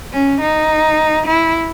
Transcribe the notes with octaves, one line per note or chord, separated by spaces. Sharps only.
C#4
D#4
E4